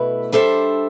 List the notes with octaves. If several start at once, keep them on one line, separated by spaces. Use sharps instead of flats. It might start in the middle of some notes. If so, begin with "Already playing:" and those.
Already playing: B2 A3 E4 B4
G3 D4 A4 C5 E5